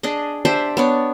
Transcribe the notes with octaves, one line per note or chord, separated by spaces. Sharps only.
D4 G#4 D#5
D4 G4 C5 E5
B3 D4 C#5